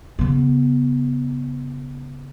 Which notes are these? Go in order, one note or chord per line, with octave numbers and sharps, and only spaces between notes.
C#3 B3